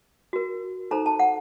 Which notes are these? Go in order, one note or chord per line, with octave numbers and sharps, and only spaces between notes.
F#4 A#4
D#4 A4 C5 A#5
A5
F#5